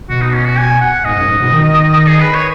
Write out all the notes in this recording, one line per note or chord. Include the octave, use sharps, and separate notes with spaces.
B2 F#4
D#4
C#4
F#4
G#5
F#5
G#2 D#5
F#2
G#2
B2
D#3
G#4
B4
C#5